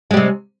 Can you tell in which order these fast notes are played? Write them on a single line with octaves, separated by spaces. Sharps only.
G#3 G3 C3